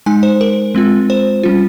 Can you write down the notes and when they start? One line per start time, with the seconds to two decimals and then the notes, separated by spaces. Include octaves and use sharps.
0.06 G#3 D#4 G#5
0.23 C5
0.41 A#4
0.75 G#3 C4 F4
1.10 C5
1.43 G3 C#4 F4